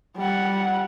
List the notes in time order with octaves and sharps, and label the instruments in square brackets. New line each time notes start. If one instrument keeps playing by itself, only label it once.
[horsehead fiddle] G3 F#5